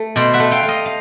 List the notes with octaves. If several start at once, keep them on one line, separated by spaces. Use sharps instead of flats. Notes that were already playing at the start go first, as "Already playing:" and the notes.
Already playing: A3
B2 C5 D5
E5 F#5
A3
F5 G5
A3
D#5 F5
F5